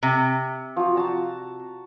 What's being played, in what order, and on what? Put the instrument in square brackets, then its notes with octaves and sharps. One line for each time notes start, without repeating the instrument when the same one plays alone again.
[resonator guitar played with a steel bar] C3
[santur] F3 F#4
F#4 A5 A#5